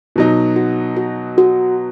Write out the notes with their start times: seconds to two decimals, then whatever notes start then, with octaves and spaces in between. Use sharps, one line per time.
0.16 B2 F#3 D#4
0.56 F#4
0.97 F#4
1.38 F#4